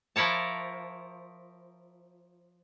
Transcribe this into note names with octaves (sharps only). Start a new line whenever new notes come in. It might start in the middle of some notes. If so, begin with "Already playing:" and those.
F3 E4 A#4 C#5 A5